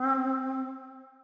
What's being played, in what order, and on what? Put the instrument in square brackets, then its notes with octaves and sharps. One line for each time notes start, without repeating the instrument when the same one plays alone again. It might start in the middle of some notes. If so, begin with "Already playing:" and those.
Already playing: [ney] C4